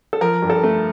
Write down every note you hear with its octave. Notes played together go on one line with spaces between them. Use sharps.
A4
F3 A#4
G2
A4
A3